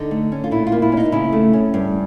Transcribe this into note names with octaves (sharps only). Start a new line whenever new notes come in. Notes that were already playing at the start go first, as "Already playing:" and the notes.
Already playing: D3 D#4
A3
C#4
F4
A#2 E4
F4
A#3
E4
C#4
D#4
C#3 E4
A3
C#4
G2